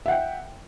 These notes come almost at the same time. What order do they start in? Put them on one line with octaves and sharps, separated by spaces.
E5 F#5 G5